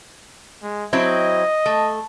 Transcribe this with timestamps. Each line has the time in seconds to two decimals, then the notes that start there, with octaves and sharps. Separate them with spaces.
0.63 G#3
0.93 F#3 C4 E4 D#5
1.66 A3